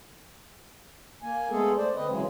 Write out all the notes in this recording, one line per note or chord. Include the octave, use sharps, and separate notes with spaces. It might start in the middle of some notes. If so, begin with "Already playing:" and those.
A#3 G#5
G#3 A3 B3 G#4 A4
A3 C5 D5
D3 C4 B4 D#5
C#3 E3 F#3 G#3